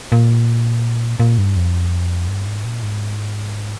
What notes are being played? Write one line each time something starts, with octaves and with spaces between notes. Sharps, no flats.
A#2
A#2
G2
F2
G2
G#2
A#2
G#2